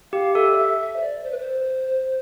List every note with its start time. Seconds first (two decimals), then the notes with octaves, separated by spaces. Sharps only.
0.12 G4 F5
0.35 A4 E5
0.53 D5
0.57 E5
0.80 E5
0.96 C5
1.02 D5
1.24 C5
1.32 B4
1.38 C5